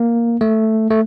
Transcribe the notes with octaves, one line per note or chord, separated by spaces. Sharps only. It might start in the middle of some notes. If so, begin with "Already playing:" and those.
Already playing: A#3
A3
A3